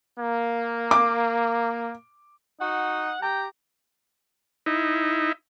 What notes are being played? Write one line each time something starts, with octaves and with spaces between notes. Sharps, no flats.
A#3
D6
D#4 F#4 F#5
G4 G5 A#5
D#4 E4